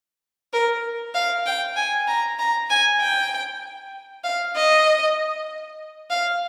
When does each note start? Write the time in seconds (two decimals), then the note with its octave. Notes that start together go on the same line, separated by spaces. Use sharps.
0.53 A#4
1.15 F5
1.46 G5
1.76 G#5
2.07 A#5
2.39 A#5
2.70 G#5
3.00 G5
4.24 F5
4.55 D#5
6.10 F5